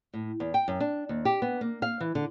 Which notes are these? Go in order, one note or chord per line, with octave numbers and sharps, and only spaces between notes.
A2
E2
G5
F#2
D4
D#2
G4
B3
A#3
F5
E3
D3